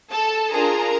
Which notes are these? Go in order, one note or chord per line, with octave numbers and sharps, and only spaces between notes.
A4 A5
D4 F4 G#4 A#4 A#5